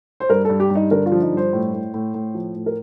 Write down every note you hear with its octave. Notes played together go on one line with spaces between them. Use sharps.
C5
G2 A#4
G2 A4
G4
G2
D#4
D3 A#4
F4
F3
D#4
G2 C5
A2
A2
A2
A2
F3
A2
A#4